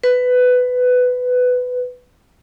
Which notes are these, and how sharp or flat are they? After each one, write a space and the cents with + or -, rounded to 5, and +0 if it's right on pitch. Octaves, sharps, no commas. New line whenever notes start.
B4 +15